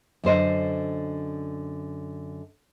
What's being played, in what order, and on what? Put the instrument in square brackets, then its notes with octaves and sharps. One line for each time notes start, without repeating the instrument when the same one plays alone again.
[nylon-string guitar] F#2 D3 C5 D#5